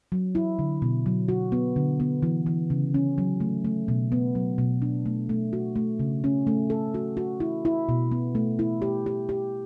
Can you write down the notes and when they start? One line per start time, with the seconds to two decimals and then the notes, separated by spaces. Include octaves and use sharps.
0.12 F#3
0.35 E4
0.59 D3
0.82 B2
1.06 F#3
1.28 F#4
1.52 B3
1.76 D3
2.00 B3
2.23 E3
2.46 E3
2.70 C#3
2.94 C#4
3.18 F#3
3.40 A3
3.65 A3
3.88 B2
4.12 B3
4.35 F#3
4.58 B2
4.82 D4
5.06 A3
5.29 A3
5.53 F#4
5.76 A3
5.99 C#3
6.24 C#4
6.47 A3
6.70 A4
6.94 F#4
7.17 F#4
7.40 E4
7.65 E4
7.89 B2
8.11 B3
8.35 A3
8.59 E4
8.82 G4
9.06 G4
9.29 G4